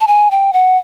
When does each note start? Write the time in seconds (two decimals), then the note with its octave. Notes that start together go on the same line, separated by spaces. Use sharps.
0.01 A5
0.07 G#5
0.31 G5
0.53 F#5